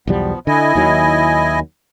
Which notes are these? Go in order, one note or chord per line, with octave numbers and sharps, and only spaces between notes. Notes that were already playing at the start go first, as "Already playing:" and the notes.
B1 E2 F3 G3 B3
D3 E4 D#5 G#5
D#2 D#3 F#3